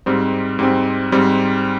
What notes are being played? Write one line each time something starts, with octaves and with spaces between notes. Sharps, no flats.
G#2 G3 C4
G#2 G3 C4
G#2 G3 C4